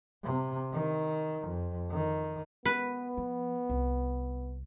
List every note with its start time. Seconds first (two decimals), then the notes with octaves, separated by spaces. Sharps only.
0.24 C3
0.73 D#3
1.48 F2
1.91 D#3
2.65 B3 B4
3.18 F3
3.70 C2